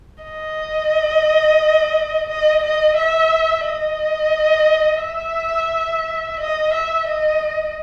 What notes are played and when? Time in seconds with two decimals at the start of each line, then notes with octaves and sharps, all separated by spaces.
0.24 D#5
2.29 D#5
2.63 D#5
2.98 E5
3.66 D#5
5.03 E5
6.40 D#5
6.74 E5
7.08 D#5